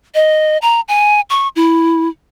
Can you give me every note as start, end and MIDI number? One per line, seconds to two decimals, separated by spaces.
0.15 0.58 75
0.62 0.81 82
0.88 1.21 80
1.30 1.48 85
1.56 2.09 64